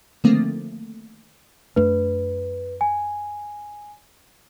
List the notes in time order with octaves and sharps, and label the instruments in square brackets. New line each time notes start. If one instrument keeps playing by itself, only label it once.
[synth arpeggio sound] D3 D#3 F3 A3 A#3 C4
[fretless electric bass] F#2 A3 D4 [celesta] B4
[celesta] G#5